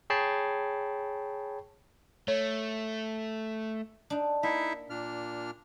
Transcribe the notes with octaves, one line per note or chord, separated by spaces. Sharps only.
G#4 C#5 G5 A5 B5 C7
A3 C#5
D4 D#4
A#3 D#4 E4 E5
A#2 D4 F6